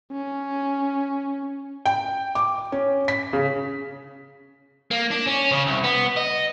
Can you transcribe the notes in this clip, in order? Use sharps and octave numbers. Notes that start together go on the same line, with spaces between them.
C#4
G5
D6
C#4
B6
C#3
A#3
D4
C#4
C#3
C2
B3
D#5